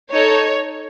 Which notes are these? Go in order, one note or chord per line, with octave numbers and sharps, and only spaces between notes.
D#4 A4 C#5